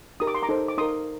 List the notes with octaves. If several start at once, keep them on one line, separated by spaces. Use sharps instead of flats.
D#4 G4 A#4 D#6
D6
C6
A#5 D6
D#4 A4 C5
D6
D#4 A#4 C6 D#6